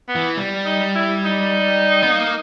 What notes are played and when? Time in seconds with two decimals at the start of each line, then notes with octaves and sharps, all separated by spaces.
0.09 B3
0.15 E3
0.37 G3
0.66 D#4
0.95 E4
1.25 D#4
2.03 B3
2.11 A#3